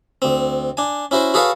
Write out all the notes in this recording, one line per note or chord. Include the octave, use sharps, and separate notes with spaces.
D2 C4
D4 G#5
C#4 E4 F#4 C5
F#4 G#4 A4 B4 C#5 F5